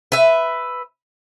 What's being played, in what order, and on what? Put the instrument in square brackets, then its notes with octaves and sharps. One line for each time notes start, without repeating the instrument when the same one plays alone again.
[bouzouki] B4 E5